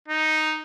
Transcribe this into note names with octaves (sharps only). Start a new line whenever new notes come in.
D#4